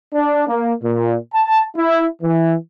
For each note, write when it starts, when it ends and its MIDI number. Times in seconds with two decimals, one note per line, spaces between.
0.14 0.44 62
0.48 0.73 58
0.83 1.16 46
1.34 1.64 81
1.76 2.05 64
2.22 2.55 52